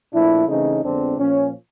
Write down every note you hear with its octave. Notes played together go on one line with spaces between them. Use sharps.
A#2 F3 A3 D4 E4
C#3 E3 A3 C4 C#4 D#4
F2 D3 F3 G#3 B3 C4 D4
A#2 F3 A#3 C#4